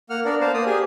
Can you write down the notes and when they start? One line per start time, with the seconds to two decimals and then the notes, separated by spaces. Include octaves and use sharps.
0.10 A#3 F#5 F6
0.25 B3 D4 A#4 D5
0.41 C5 F5 A5
0.54 A#3 D5 D#6
0.66 G4 G#4 G#5